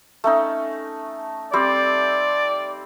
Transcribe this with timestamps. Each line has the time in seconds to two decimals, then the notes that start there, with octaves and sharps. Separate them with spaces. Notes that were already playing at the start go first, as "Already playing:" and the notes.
0.24 A3 C#4 D#4
1.53 G3 C4 D5